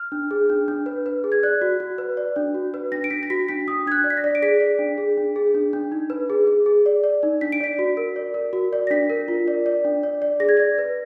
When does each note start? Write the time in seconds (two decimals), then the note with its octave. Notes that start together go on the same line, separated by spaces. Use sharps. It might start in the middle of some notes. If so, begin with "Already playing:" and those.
Already playing: F6
0.12 D4
0.31 G#4
0.49 D4
0.68 D4
0.86 B4
1.06 B4
1.24 G#4
1.32 G#6
1.43 D5 F#6
1.62 F#4
1.80 F#4
1.98 B4
2.17 D5
2.36 D4
2.54 F#4
2.74 B4
2.92 D4 A#6
3.04 D7
3.11 D4 B6
3.23 A#6
3.30 F#4 B6
3.49 D4 B6
3.68 D4 D#6
3.87 D4 G#6
3.92 F#6
4.04 D5
4.10 B6
4.17 A#6
4.24 D5
4.35 D7
4.42 G#4 B6
4.60 D5
4.79 D4
4.98 G#4
5.17 D4
5.36 G#4
5.54 D4
5.73 D4
5.92 D#4
6.10 B4
6.30 G#4
6.47 G#4
6.66 G#4
6.86 D5
7.04 D5
7.23 D#4
7.41 D4 B6
7.52 D7
7.60 D5 B6
7.79 F#4
7.97 A#4
8.16 D5
8.34 A#4
8.53 F#4
8.73 D5
8.87 A#6
8.90 D4 B6
9.10 A#4
9.28 F4
9.48 D5
9.66 D5
9.85 D4
10.03 D5
10.22 D5
10.40 G#4 A#6
10.49 G#6
10.57 D5 A#6
10.78 B4